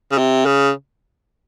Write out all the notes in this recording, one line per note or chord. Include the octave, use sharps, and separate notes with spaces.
C#3
C3
C#3